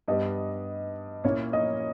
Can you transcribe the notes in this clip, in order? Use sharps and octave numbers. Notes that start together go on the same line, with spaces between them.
G2 G3 B3 D#5
A#2 A#3 C#4 E4 C#5
D#5